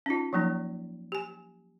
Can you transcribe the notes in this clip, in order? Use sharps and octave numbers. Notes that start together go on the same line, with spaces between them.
C#4 D#4 F4
F3 F#3 A#3 D#4
G4 G#5